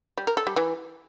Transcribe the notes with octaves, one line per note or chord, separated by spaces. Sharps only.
G3
A#4
A4
G3
E3